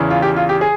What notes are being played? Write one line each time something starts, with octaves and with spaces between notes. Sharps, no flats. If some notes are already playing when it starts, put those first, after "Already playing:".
Already playing: E2 C#3 E3
F4
G4
F4
G4
G#4